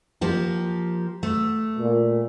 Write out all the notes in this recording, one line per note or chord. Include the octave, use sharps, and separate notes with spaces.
F3 A#3 G4
A3
A#2